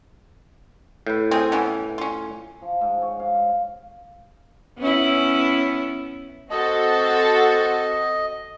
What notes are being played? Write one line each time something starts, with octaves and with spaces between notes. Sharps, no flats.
A2 B4
C4 F4 G#4
E3 B3 C#4
C#4 F4
F3
G#2
C#5
F5
B3 C#4 E4
C4 F#4 A4 D#5